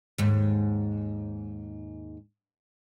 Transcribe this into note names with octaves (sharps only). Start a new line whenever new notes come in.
D#2 G#2